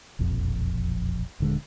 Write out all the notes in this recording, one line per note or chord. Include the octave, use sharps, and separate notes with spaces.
E1 A#1 F2
D#1 D3 G#3